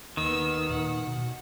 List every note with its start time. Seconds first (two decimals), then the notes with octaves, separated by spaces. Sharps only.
0.17 D#2 D#3 B3 E6
0.70 A#2 F#5
1.07 B2